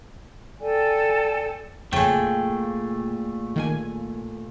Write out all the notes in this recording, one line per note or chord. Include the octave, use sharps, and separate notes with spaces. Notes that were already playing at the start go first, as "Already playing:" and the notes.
A4 D5 G5 G#5
F2 A#2 C#3 A3 G#4 G5
D#3 A#3 G#5